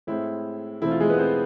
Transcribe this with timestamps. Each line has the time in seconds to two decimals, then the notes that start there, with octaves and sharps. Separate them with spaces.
0.07 A2 G#3 C4 E4
0.82 E2 B2 A3 C4 E4
0.91 F4
1.00 G#3 G#4
1.10 B3 B4
1.19 C4 C5